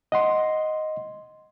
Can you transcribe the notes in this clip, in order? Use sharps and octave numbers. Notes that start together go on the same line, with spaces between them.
D#5 F#5 C6